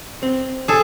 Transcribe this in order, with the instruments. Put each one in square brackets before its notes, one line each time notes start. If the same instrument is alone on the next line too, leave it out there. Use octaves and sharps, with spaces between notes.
[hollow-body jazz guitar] C4
[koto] G#4 A4